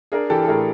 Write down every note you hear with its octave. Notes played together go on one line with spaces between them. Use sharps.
D4 G#4 A#4
E3 G4 A4
A4
A2 G#4 A#4